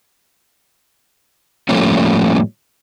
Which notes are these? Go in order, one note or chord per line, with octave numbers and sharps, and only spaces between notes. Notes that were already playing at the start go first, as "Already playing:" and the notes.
A2 F3 G3 A3 A#3 C#4